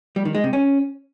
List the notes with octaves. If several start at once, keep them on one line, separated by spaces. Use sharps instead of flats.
G3
D#3
G#3
C3
C#4